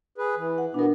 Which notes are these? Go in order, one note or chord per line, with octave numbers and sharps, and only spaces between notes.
G#4 B4
E3
F#5
B2 B3 D4 A#4